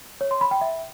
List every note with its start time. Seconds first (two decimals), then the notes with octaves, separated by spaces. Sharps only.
0.21 C#5
0.31 C6
0.41 B5
0.51 G5
0.61 E5